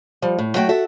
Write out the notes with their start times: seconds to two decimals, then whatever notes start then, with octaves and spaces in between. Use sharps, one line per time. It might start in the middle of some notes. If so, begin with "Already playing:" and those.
0.22 F3 G3
0.38 A2
0.54 F#3 A3 F#4 E5 G5
0.69 F#4 A4 E5